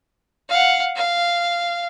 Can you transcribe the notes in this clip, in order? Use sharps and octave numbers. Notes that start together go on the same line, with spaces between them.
F5 F#5
F5